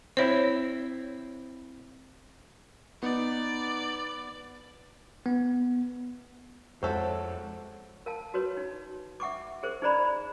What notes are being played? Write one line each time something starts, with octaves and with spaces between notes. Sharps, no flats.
C4 E4 C5 C#5
B3 D#4 D5
B3
F2 G#3 F#4 A4 C5 C#5 E5
A#4 F5 A5
F#4 B4 C#5
D#4
E5 F#5 C#6 D6
G#4 A#4 C5
D#4 G#4 C5 D5 A#5 B5